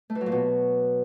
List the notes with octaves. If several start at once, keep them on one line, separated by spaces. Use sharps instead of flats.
A3
E3
F#3
A#2
B2